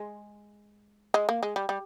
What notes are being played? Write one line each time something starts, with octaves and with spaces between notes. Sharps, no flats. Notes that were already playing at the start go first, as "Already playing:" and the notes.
Already playing: G#3
G#3
A#3
G#3
G3
G3